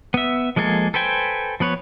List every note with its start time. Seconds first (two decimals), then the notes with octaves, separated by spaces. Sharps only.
0.14 B3 E5
0.56 F3 G#3 A#3 G#4 A4
0.94 A4 B4 C5 G5 G#5
1.60 F3 B3 B4 C#5